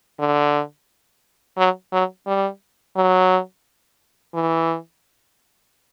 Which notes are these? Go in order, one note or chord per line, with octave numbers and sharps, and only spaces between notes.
D3
F#3
F#3
G3
F#3
E3